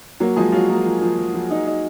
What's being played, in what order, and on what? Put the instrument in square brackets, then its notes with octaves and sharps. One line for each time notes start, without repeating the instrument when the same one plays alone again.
[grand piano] F#3 F#4 [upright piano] A#3
[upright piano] F3 [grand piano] G#3 G#4
[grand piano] F#3 F#4 [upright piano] F4
[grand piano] A#3 A#4 [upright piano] F4
[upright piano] F3
F3
F3
F3
D#4
D#4